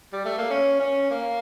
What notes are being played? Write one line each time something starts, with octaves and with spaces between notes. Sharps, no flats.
G3
A3
A#3
C#4
C#4
A#3